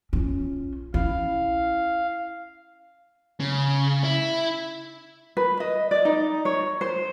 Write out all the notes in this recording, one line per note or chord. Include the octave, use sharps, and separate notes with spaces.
C#4 F4
C#4 E4 F5
C#3
E4
B4
D#5
D5
D#4
C#5
C5